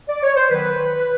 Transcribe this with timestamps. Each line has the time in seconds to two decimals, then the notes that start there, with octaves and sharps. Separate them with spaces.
0.09 D5
0.23 C#5
0.37 C5
0.50 D#3 F#3 B3 B4